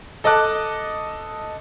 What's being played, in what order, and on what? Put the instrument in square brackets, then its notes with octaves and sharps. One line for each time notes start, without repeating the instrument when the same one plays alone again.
[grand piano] A4 D#5 A5 D6 F#6